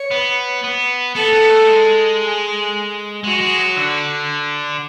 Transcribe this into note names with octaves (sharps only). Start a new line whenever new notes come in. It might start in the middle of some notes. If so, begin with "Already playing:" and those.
Already playing: C#5
B3
B3
B3 A4
B3
A3
G#3
G#4
G#3 F#4
G#3
F#3
D3